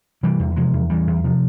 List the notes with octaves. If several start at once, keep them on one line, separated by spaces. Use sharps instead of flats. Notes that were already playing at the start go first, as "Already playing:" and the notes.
C3 E3 G3
E2
C3 F3 G#3
E2
E2 E3 G3
E2
C3 F3